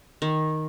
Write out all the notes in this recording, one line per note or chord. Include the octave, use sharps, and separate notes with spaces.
D#3